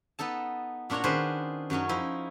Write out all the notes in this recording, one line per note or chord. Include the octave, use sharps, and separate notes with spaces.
B3 D#4 A4 A5
A#2 D4 F#4 C#5 A#5
D#3 C#4 D4 G#4 B4 C5
F#2 F#3 C#4 D#4
F3 D#4 E4